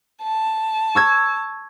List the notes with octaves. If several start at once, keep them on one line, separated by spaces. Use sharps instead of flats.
A5
C#6 E6 G#6